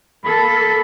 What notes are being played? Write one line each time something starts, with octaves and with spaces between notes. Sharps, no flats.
A#3 A4 B5